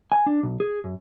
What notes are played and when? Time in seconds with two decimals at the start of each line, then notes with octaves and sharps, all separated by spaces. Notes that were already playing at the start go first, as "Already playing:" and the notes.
0.12 G#5
0.26 D4
0.43 B1
0.60 G#4
0.84 F#2